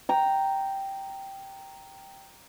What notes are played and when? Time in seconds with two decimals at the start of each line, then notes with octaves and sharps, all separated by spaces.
0.09 G5 A#5